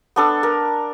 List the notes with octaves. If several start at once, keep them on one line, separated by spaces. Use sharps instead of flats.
B3 D4 A4
A#4